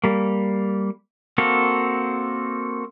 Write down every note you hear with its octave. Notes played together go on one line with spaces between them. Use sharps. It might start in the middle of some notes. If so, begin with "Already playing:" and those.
G3 A#3
A#3 C4 F#4 A4 F5